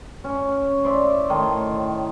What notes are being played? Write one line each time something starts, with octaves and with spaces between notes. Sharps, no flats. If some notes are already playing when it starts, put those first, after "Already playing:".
C#4
C5 D5 E5
A2 D#3 A5 C6